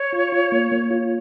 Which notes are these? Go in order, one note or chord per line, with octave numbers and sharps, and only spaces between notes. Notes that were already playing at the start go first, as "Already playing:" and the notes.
Already playing: C#5
F4
F4
A#3
A#3
F4